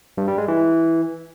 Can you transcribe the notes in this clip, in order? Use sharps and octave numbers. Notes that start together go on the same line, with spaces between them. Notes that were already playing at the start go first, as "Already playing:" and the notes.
G2
G3
G#3
E3